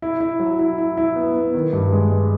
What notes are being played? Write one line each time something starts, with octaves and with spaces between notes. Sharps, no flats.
E4
E4
F#3
E4
E4
E4
B3
B3
D#3
G2
G#3
G#3